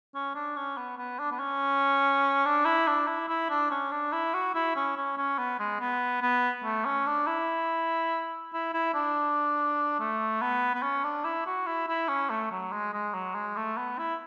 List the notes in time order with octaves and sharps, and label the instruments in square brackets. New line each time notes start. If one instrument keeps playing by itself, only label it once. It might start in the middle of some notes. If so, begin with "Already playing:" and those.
[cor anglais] C#4
D4
C#4
B3
B3
D4
B3
C#4
D4
E4
D4
E4
E4
D4
C#4
D4
E4
F#4
E4
C#4
C#4
C#4
B3
G#3
B3
B3
A3
C#4
D4
E4
E4
E4
D4
A3
B3
B3
C#4
D4
E4
F#4
E4
E4
C#4
A3
F#3
G#3
G#3
F#3
G#3
A3
B3
E4